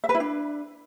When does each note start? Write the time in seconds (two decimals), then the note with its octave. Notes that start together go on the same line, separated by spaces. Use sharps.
0.04 E5
0.09 B4
0.15 E4
0.20 D4